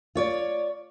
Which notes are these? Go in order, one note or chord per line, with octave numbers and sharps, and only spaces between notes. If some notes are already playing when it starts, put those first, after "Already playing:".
F4 C#5 D5